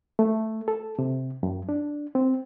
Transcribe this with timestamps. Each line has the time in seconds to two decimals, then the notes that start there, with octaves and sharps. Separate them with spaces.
0.19 A3
0.68 A4
0.99 C3
1.43 F#2
1.69 D4
2.15 C4